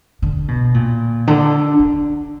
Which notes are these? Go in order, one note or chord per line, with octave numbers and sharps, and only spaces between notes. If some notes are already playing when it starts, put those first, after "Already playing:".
D3
B2
A#2
D3
D3